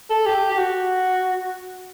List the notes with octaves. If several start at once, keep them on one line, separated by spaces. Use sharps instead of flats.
A4
G4
G4
F#4